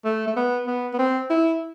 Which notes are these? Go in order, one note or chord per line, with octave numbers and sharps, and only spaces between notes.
A3
A3
B3
B3
B3
C4
E4